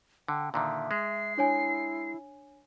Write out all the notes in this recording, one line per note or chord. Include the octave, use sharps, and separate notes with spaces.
D3 G5
A#2 D3 D#3 E5
G#3 C7
D4 E4 C#5 G#5